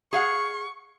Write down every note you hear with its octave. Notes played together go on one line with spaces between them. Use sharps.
G#4 F5 F#5 C#6